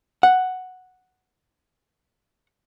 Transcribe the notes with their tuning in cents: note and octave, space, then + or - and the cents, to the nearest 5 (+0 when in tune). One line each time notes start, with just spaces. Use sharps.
F#5 +0